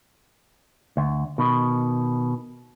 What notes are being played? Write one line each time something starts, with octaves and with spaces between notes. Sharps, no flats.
D2
B2 D#3